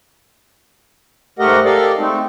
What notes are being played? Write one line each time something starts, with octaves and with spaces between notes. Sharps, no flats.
G#2 A3 G4 A#4 D#5 F#5
G4 A4 A#4 D5 D#5 F5
G#3 A3 C4 D#4